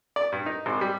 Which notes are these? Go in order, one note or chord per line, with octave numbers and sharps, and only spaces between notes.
D5
G2
D#4
G#1
G3